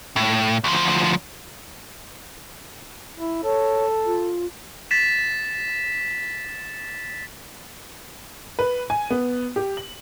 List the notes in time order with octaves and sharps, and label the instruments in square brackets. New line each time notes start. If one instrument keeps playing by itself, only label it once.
[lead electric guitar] A2
D2 F3
[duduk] E4
[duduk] A4 [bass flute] C#5
[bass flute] F4
[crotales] A6 B6 E7
[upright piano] B4
G#5
B3
G4
F#7